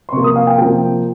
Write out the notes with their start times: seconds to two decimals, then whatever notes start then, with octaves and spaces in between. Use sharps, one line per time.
0.09 C6
0.13 C3 F3 A#3 C#6
0.24 D#6
0.36 F5
0.47 G5
0.58 C3 F3 A#3 G5